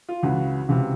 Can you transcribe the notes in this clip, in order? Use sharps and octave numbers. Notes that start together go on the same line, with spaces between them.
F4
C#2 C#3 E3 F#4
C#2 C3 E3